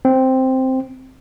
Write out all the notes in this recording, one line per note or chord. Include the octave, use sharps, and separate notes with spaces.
C4